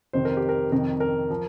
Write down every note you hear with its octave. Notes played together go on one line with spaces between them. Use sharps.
F2 C3 D#3 C5
A#4
G4
A#4
F2 C3 D#3 A#4
A#4
F3